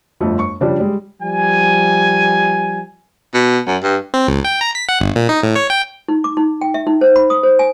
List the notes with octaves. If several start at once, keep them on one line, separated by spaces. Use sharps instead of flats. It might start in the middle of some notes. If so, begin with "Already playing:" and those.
G1 F2 A3 D#5
C#6
C#3 F3 G3 D4
G3 G#3
F3 G3 G#5
B2
F#2
G2
C4
C#2
G5
A#5
B6
F#5
G1
A#2
D#4
A2
C#5
G5
D#4
D6
D#4
G5
E5
D#4
C5
B5
D#6
C5
G#5